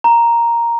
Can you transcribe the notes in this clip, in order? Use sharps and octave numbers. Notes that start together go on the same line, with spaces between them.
A#5